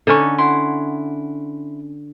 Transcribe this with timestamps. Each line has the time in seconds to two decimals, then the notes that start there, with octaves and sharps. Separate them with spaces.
0.07 D3 C#4 D#4 C#6
0.38 E4 F#5 C6